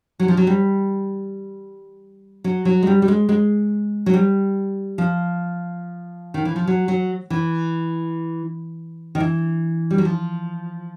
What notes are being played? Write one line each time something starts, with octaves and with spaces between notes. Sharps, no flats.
F#3
F3
F#3
G3
F#3
F#3
G#3
G3
G3
G#3
G#3
F#3
G3
F3
D#3
E3
F3
F#3
F#3
E3
D#3
E3
G3
F#3
F3